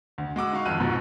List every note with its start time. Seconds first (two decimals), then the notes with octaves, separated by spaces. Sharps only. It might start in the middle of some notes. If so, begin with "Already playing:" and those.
0.18 D2
0.36 G#3 F#4 D6 E6
0.52 D#4 F#4 F5 C#6
0.65 G#1 F2 E6 F#6 D#7
0.80 B1 G#2 B2 F3